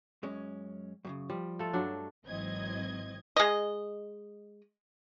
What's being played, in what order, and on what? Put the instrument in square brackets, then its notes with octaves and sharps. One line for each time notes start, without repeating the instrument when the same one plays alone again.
[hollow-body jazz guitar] F#2 G#3 C#4
F#2 A#2 C#3
[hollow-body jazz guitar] F3 [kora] G3
[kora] A3 F4 A4
G2 F#3 D4
[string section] G#1 E3 F#3 C4 D#5 G#6
[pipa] G#3 D#5